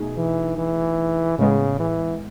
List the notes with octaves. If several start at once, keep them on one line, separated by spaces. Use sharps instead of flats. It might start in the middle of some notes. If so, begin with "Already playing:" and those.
Already playing: B2 A3 D#4 G#4
E3
E3
A2 C#3 G#3 B3
E3